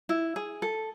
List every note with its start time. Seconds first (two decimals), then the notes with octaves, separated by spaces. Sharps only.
0.09 E4
0.36 G#4
0.62 A4